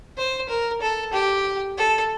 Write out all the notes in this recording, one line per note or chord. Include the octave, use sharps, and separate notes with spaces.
C5
A#4
A4
G4
A4